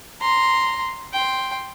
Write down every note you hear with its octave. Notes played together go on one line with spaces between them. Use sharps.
A#5 C6
G5 C6